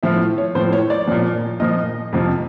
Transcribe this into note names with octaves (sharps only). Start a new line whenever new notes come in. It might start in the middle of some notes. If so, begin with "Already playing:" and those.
A2 F3 E5
C#5
A2 F3 C5
C#5
D5
A#2 F3
A#2 F3 D#5
F2 C3 F3